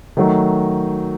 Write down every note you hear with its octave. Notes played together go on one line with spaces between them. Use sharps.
D#3 F#3 A3